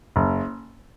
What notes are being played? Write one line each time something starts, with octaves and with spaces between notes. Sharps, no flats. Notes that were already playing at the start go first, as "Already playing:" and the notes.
F#1